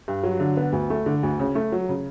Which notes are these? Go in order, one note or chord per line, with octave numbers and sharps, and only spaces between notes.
G2
F#3
D3
B3
D2
A3
D3
D2
C#3
A3
F#3
C#3